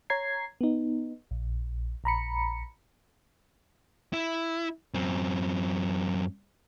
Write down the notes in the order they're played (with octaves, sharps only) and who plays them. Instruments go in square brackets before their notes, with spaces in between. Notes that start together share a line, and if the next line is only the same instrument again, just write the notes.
[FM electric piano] C#5 A#5 G#6 C7
B3 D#4
A#1
A#1 A#5 B5 C#7
[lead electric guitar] E4
F#2 C4